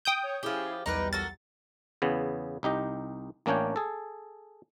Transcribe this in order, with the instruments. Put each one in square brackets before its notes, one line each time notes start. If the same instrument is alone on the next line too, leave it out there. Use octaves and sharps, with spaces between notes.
[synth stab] G5 D#6 G6
[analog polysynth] C#5
[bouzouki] F3 G4 [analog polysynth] C#4 E4 G#4
[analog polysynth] B1 E2 G3 [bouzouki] D#4 A#4 B4
[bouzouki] F#4 A4 A#4 [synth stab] A6
[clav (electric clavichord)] E2 C#3 B3
C2 D#4 G4 D#5
A1 A#3 C#4 D4 C#5 G5
G#4 A4